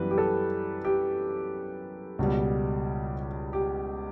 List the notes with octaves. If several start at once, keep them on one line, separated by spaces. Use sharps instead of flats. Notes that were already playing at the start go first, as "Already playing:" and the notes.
Already playing: F#2 E3 G3 B3 B4
G4
A4
G4
C#2 B2 G3
G4